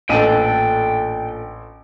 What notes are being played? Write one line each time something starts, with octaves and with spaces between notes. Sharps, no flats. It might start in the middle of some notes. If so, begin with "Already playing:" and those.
A1 A#2 D4 A4 G5 D#7